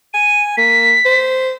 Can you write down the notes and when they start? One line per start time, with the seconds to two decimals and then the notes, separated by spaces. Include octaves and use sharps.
0.14 G#5 D#7
0.57 A#3 B6
1.05 C5